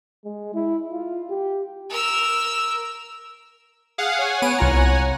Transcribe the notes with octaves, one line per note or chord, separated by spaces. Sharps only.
G#3
E4
F4
G4
A#4 E6
G#4 F5 F#5
C#5 F#5 G#5
B3 D7 D#7
C2 F4 A#5